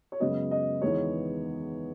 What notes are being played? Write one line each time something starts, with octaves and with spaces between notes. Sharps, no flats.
C#5
F#2 C#3 G#3 B3 D#5
D#5
E2 D#3 G#3 B3 C#5